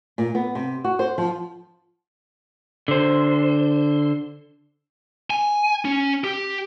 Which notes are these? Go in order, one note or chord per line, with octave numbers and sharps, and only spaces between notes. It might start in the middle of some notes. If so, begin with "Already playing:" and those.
A#2
B3
C3
F#4
C5
F3
D3 C5
G#5
C#4
G4